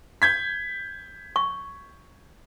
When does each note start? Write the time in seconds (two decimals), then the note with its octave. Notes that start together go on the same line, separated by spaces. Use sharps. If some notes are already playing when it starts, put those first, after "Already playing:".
0.22 G6 G#6 B6
1.36 C#6